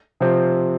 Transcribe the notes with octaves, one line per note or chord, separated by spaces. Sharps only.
C3 F3 C4